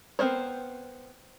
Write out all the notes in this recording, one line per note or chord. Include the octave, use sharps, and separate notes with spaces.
B3 C4 A#4 C5 C#5